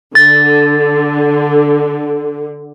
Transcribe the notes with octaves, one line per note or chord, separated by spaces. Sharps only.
D3 A6